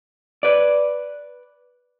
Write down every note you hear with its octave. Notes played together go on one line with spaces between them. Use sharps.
B4 D5